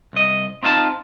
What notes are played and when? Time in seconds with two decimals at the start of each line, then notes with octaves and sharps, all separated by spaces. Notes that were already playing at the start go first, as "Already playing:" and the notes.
0.13 C2 D#5
0.63 C4 D#4 F4 E5 A5